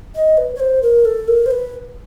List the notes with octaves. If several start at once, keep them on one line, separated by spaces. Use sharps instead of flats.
D#5
B4
C#5
C5
A#4
A4
A#4
C5
B4